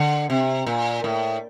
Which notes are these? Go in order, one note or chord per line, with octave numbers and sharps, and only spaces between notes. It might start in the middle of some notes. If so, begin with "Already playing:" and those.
Already playing: D3
C3
A#2
A2